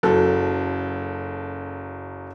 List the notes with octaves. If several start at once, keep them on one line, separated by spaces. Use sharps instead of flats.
F#1 F#3 A4